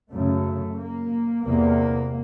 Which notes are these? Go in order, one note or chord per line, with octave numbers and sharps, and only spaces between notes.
F#2 C#3 A3
A#3
E2 C3 A#3